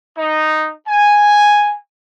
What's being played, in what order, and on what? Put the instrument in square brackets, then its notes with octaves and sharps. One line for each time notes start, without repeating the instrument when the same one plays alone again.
[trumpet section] D#4
G#5